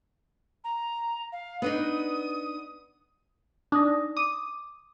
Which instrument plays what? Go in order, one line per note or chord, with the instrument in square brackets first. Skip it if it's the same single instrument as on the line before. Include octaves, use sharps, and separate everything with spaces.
[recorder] A#5
F5
[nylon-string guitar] B3 D4 D#4 [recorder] D#6
[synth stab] D4 [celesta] D#4 D#6 A#6
[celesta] D6 [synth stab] D#6